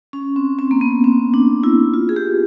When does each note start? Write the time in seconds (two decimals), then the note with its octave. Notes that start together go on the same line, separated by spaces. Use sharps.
0.13 C#4
0.36 C4
0.59 C4
0.71 A#3
0.81 B3
1.04 C4
1.34 D4
1.63 E4
1.94 F4
2.09 G#4
2.16 G4